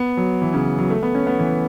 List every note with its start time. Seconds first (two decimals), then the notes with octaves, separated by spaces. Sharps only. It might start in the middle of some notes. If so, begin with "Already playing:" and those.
Already playing: B3
0.17 F#3
0.42 E3
0.54 C#3
0.79 F#3
0.90 A3
1.03 B3
1.15 C#4
1.27 B3
1.39 E3